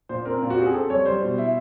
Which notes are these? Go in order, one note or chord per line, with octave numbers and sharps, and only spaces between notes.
A#2 C5
C4 A#4
A#2 F4
F#4
C4 G4
G#4
C4 A4
G3 C#5
G3 C5
B2
E4